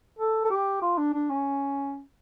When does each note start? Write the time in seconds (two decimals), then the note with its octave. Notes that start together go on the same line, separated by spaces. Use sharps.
0.19 A4
0.45 A4
0.50 G4
0.82 F4
0.98 D4
1.14 D4
1.30 C#4